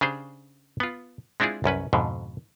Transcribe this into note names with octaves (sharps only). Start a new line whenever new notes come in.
C#3 D4 G4 G#4 C5
B3 F4
G#3 C4 D4 E4 F4 G#4
C2 F#2 C#4 B4
F2 G#2 B2 D3